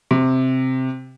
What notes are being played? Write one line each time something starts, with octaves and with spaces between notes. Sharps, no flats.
C3